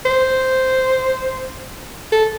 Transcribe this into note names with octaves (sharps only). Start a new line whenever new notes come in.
C5
A4